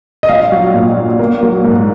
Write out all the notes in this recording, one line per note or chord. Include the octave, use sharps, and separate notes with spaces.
D#5
A#1 F5
F#3
A#2
A#1
A#3
F#3
G#2